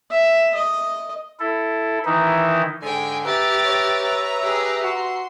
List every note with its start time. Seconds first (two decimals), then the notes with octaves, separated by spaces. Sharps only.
0.11 E5
0.55 D#5
1.40 E4 A4
2.05 D#3 E3 D#4 E4
2.83 G#2 D3 G#3 G5 G#5
3.25 G4 B4 E5 A#5 A6
3.65 C#5
4.42 G4 G#4
4.83 F#4 C6